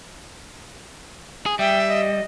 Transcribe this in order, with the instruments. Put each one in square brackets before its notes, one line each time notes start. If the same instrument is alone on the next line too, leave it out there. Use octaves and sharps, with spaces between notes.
[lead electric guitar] G#4
[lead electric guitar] G3 [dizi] E5 [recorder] G5
[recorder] D#5